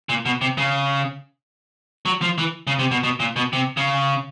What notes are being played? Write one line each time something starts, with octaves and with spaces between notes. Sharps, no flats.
A#2
B2
C3
C#3
F#3
F3
E3
C#3
C3
B2
B2
A#2
B2
C3
C#3